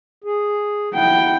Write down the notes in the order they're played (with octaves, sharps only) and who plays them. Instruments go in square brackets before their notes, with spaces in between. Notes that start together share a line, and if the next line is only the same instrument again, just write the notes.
[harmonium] G#4
[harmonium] E4 F#5 [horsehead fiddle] G5